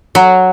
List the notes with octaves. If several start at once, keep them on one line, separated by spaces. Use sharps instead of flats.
F#3